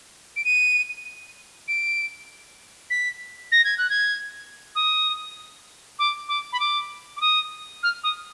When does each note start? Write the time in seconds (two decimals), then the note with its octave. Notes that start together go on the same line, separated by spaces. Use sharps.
0.36 D7
0.44 D#7
1.68 D7
2.90 B6
3.52 A#6
3.64 G#6
3.78 F#6
3.90 G#6
4.75 D#6
5.99 D6
6.28 D6
6.52 B5
6.60 D6
7.16 D6
7.21 D#6
7.83 F6
8.03 D#6